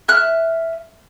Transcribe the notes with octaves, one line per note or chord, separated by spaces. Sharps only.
E5 F6 F#6